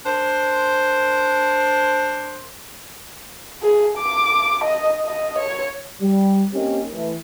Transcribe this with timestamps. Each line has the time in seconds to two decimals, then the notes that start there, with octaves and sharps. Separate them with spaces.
0.05 D4 A#4 C5
3.63 G#4
3.98 D6
4.64 D#5
5.06 D#5
5.38 C#5
6.01 G3
6.53 A#3 C4 C#4 D#4 G4
6.92 E3 A3